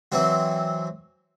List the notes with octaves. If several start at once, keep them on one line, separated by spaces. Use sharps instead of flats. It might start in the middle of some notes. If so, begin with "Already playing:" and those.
E3 F#3 C4 F#4